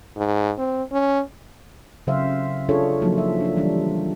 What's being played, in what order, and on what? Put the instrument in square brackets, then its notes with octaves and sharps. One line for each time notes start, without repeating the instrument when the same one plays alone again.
[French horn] G#2
C4
C#4
[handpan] C#3 F#3 C5 E5 F5
D4 F4 G#4 A4 C#5
F3 F#3 A#3 D#4
F#3 E5
D4 F4
E3 G3 D4